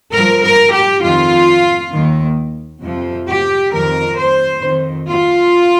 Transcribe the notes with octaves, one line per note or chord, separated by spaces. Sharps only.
G2 F3 A#4
A#4
G4
F2 D#3 F4
D#2 D#3
F2 C3 F3
G4
F2 D#3 A#4
C5
F2 D#3
F4